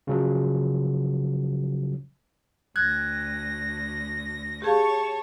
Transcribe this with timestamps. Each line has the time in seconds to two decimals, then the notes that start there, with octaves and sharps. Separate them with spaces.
0.07 C#3 F3 F#3
2.76 D2 F#6 G#6 A#6
4.62 G4 G#4 C#5 F5 A5 C#6